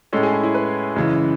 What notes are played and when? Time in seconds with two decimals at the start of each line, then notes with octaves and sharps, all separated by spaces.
0.13 A2 G#3 C#4 A4
0.23 G#4
0.33 E4
0.43 E4
0.54 B4
0.96 F#2 C#3 E3 G#3